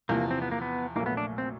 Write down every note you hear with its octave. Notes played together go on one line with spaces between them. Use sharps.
E2 C3 F3 A#3
C4
B3
A#3
B3
A#1 A#2 F#3 A3 A#3
B3
D4
C4